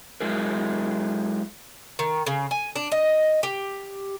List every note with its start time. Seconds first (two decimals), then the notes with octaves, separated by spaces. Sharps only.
0.21 F#3 G#3 E4 G#4 A#4
1.99 D#3
2.27 C#3
2.51 G#5
2.76 D4
2.92 D#5
3.43 G4